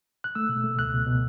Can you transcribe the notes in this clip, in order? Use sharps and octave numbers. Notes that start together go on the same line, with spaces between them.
F#6
A3 E6
B2
A3
C#2 F#6
B2
B2